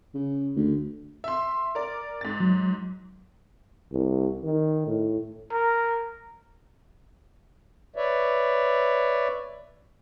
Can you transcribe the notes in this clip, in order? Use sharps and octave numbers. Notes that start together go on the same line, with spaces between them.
C#3
D2
E5 C6
A#4 D5
G#2 A6
F#3
C2
D#3
A2
A#4
B4 C#5 D5 E5